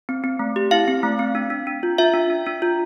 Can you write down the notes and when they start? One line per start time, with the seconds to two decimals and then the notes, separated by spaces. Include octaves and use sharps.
0.09 C4
0.24 C4
0.39 A3
0.56 G4
0.71 E4 F5
0.88 C4
1.03 A3
1.19 C4
1.35 D4
1.50 D4
1.67 D4
1.83 F4
1.98 F4 E5
2.14 D4
2.30 D4
2.46 D4
2.62 F4